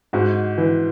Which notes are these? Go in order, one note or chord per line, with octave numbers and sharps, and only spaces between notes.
G#2 F#4
E3